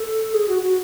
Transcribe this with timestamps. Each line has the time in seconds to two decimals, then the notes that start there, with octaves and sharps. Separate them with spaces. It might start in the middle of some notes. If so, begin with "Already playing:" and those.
Already playing: A4
0.33 G#4
0.48 F#4
0.62 F#4